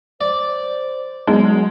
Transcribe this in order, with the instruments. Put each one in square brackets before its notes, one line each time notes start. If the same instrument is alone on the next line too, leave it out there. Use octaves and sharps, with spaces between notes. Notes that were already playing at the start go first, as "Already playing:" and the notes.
[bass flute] C5 [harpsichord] D5
[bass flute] F#3 [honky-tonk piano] G#3 [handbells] B3 D#4 A5